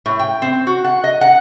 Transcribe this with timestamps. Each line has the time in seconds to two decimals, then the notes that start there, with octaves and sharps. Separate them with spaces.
0.06 A2
0.19 G5
0.42 C4
0.67 F#4
0.84 F#5
1.04 D#5
1.21 F#5